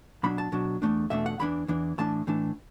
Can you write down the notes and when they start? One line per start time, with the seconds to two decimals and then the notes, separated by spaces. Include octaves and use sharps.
0.23 B2 F#3 D4 B5
0.38 A5
0.52 B2 F#3 D4
0.82 E2 B2 A3 D4
1.10 E2 B2 A3 D4 E5
1.26 F#5
1.39 E2 E3 D4 B5
1.68 E2 E3 D4
1.98 A2 E3 D4 A5
2.27 A2 E3 D4